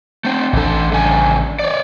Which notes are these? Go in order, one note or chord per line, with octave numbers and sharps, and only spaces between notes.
A3 C4
A1 E3 D4 A4
G2 C#3 G#5
C#5 D5